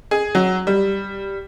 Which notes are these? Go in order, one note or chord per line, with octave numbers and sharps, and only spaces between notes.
G#4
F#3
G3